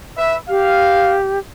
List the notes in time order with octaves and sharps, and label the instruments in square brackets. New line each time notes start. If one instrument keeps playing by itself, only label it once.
[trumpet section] B4 E5
[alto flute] G4 [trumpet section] F5